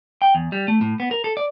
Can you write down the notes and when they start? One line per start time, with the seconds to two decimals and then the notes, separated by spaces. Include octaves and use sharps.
0.22 G5
0.35 E2
0.52 G3
0.68 A3
0.81 A2
1.00 B3
1.11 A#4
1.24 A4
1.37 D5